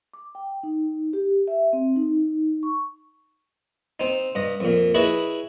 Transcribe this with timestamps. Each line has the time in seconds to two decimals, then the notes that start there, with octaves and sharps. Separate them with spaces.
0.13 D6
0.35 G5
0.63 D#4
1.13 G4
1.48 E5
1.73 C4
1.96 D#4
2.63 C#6
4.00 C4 D#4
4.35 G2 D#5
4.60 F2 A#2
4.94 E4 G#4 B4 C#5 D#5